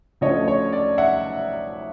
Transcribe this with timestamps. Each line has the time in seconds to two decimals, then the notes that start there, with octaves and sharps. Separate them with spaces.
0.21 D2 C#3 F3 A3 C#5 D#5
0.48 C#5
0.73 D5
0.98 E5 F#5